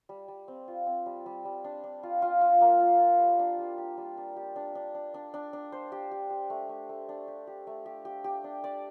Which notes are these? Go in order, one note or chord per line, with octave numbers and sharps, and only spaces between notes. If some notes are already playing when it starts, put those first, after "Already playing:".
G3
G3
C4
F4
C4
G3
G3
G3
D4
D4
F4
F4
F4
A#3
F4
F4
G3
D4
G3
G4
G3
D4
G4
D4
D4
D4
D4
D4
D4
C5
G4
G4
G4
A3
A3
A3
D4
G4
G4
A3
G4
G4
G4
D4
D5